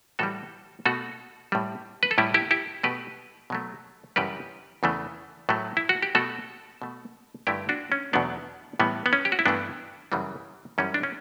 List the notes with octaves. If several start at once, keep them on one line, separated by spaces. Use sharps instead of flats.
A2 E3 G3 F#4 A4
B2 A3 F#4 A4
A2 G3
B4
A4
A2 G3 E4 G4
E4 G4
E4 G4
B2 A3 G4 B4
B2 F#3 A3
F#2 C#3 E3 G3 G4 B4
E2 C#3 E3 A3
A2 F#3 A3
E4
F#4
G4
B2 A3 F#4 A4
B2 A3
G2 D3 A3 E4 G4
D4 F#4
C#4
E2 B2 F#3 A3 B3 D4
A2 E3 G3 B3
B3
C#4
G4
F#4
E4
G2 E3 A3 B3 D4
F#2 C#3 E3 G3
F#2 E3 G3 C#4
D4
C#4